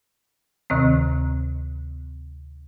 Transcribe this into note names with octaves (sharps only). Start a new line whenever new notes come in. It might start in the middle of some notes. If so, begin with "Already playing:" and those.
D2 C3 D#3 C4